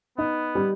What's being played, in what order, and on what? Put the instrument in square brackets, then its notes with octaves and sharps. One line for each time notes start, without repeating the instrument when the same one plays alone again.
[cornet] B3 [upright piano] D#4
[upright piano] G3